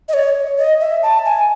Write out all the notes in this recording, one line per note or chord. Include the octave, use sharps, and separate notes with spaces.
D#5
C#5
D#5
E5
A5
G#5